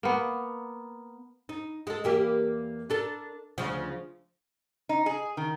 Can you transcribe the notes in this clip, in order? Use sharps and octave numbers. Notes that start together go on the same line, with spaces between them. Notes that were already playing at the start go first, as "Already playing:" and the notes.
A#3 B3
D#4
G#3 A4
E2 A#3 G4
D4 A4 A#4
D2 C#3 F3
D#4
G#4
D#3